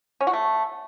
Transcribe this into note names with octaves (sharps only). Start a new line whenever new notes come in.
C#4
F#4
A3